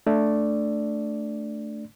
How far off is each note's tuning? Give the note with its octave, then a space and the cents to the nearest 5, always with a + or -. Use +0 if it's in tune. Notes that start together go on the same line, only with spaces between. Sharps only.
A3 +0 D4 +0 D5 +0